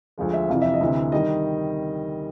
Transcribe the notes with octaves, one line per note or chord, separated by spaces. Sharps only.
D2 D3 F3 G#3
E5
F2 C3 E3 F5
E5
D#5
D2 C3 E3
E5
D#3 G3 D#5